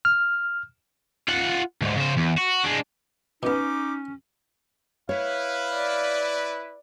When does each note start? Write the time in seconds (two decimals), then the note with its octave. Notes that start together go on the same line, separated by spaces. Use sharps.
0.05 F6
1.28 F4 F#5
1.82 D2 G#2
1.96 C#3 C5
2.17 E2
2.38 F#4
2.65 G#3 D4
3.43 B2 B3 C#4 D#4 D6
5.09 E4 B4 C#5 F5
5.73 D5